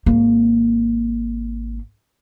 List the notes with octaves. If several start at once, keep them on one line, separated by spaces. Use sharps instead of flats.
G#1 A#3